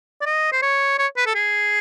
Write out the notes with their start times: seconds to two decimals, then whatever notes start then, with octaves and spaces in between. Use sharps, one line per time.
0.21 D5
0.26 D#5
0.52 C5
0.62 C#5
0.99 C#5
1.17 B4
1.26 A4
1.35 G#4